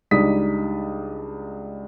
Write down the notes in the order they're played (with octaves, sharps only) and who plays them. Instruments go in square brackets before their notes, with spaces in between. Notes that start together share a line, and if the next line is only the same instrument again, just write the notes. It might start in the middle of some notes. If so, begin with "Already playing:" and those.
[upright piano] C#2 G3 D4 D#4 D#6 B6